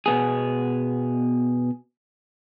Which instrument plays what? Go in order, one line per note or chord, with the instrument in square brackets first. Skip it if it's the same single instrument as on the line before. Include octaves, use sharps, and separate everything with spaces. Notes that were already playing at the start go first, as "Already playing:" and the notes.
[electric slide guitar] B2 B3 G#4